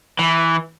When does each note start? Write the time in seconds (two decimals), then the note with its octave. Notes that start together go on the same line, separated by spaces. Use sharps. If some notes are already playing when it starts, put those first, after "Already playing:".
0.19 E3